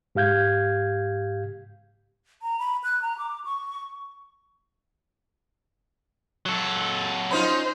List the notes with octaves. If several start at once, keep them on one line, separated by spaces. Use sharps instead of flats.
G#2 G4 F5 G6 G#6
A#5
B5
F#6
A#5
D6
C#6
F#3 A4
C#4 D#4 F4 C5